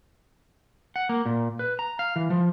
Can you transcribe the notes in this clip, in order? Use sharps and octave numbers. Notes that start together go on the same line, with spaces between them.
F#5
A#3
A#2
B4
A#5
F5
E3
F3